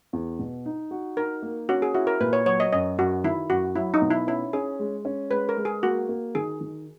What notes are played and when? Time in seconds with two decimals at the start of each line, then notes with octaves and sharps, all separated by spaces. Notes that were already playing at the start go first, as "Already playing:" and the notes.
0.13 E2
0.39 B2
0.66 D#4
0.91 F#4
1.17 D#4 A#4
1.42 A#3
1.69 C#4 F#4
1.82 G#4
1.94 E4 F#4
2.07 A#4
2.20 A#2 B4
2.33 C#5
2.46 F#3 C#5
2.60 D#5
2.72 F#2 D#5
2.98 F#2 F#4
3.24 D#3 E4
3.50 F#2 F#4
3.75 F#3 E4
3.94 D#4
4.02 B2
4.11 E4
4.27 C#4 E4
4.53 C#4 G#4
4.79 G#3
5.05 C#4
5.31 G#3 B4
5.49 A#4
5.57 G#3
5.65 G#4
5.83 A#3 F#4
6.09 A#3
6.35 D#3 G#4
6.61 D#3